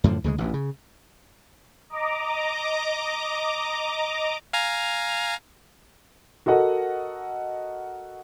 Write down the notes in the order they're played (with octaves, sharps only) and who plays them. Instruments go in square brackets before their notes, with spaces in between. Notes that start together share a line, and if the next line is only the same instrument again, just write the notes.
[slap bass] F#2 A2 D3 F3
D2 C#3 F3 G#3
A1 D2 E3
C#3
[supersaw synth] D#5 A#5 D6
[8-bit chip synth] F5 G#5 A#5
[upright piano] F#4 A4 A#4 D#5 F#5